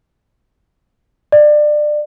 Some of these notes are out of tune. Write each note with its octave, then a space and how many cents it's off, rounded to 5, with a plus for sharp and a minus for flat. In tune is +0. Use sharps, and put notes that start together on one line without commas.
D5 +25